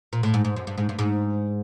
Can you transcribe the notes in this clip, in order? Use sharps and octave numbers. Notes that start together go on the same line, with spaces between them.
A#2
A2
G#2
G#2
F#2
G2
G#2
G2
G#2